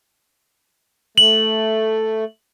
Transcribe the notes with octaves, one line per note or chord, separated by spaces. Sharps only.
A3 F#7